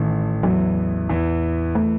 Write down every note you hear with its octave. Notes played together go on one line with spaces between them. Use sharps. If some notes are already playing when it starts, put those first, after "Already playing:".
Already playing: A1 A2 D#3
E2 E3 F#3
E2 E3
E3 A3